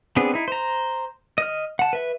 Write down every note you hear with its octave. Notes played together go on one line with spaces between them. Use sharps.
B3 C4 D4 G#4
D#4 E4
C5 A#5
D#5 F6
F#5 A5
B4 E5